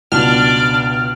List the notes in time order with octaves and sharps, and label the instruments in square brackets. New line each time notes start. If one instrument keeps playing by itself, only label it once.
[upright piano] C#2 B2 [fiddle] D4 D5 [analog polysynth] F6